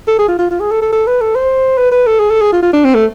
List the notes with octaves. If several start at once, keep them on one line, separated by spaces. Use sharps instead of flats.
A4
G#4
F4
F4
F4
G#4
A4
A4
A4
B4
A4
C5
B4
B4
A4
G#4
A4
G#4
F4
F4
D4
C4
A3